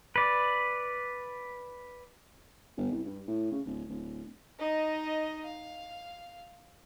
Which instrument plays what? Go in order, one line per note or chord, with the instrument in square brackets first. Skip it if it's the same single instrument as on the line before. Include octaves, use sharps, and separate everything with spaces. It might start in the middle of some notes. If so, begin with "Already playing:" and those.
[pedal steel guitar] B4 D5
[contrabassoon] G1
C2
G2
A2
C#3
D1
D1
[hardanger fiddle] D#4 D#5
F5